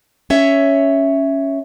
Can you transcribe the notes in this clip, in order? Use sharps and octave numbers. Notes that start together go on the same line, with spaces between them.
C#4 C#5 E5